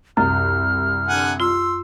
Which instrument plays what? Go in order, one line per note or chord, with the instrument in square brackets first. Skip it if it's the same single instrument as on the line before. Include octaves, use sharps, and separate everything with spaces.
[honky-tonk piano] C2 [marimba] F#2 [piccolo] F6
[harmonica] D3 F#5 G#5
[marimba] F4 [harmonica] C6 E6